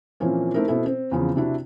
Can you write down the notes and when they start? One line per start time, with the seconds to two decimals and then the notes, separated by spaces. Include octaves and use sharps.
0.20 A#2 E3 F3 A#3 C4 C#4
0.54 A3 C4 D#4 E4 A#4
0.68 B2 C4 E4 A4
0.86 C4
1.12 E2 C#3 F3 C4
1.36 C3 D4 E4 F#4